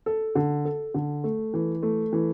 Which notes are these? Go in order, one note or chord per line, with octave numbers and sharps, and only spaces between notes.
A4
D3
A4
D3
A3
E3
A3
E3